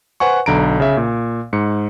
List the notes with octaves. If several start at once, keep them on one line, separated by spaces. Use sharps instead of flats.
B4 C5 F#5 G#5 C#6
B1 D3 A#5 D7
C#3 E5
A#2
G#2 C#7